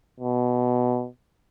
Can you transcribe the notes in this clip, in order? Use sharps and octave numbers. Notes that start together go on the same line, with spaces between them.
B2